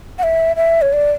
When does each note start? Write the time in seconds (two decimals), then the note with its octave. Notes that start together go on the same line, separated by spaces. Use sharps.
0.19 F#5
0.23 E5
0.56 E5
0.82 C#5
0.93 D5